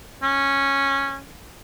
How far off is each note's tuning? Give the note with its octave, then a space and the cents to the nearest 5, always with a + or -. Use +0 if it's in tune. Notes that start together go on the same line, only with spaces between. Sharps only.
C#4 -10